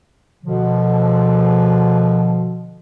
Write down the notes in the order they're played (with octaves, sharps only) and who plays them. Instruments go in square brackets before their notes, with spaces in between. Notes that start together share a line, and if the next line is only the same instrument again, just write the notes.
[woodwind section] B2 D3 F3